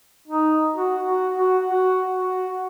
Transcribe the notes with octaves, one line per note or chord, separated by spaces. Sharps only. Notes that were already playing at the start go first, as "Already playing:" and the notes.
D#4
F#4
F#4
F#4
F#4
F#4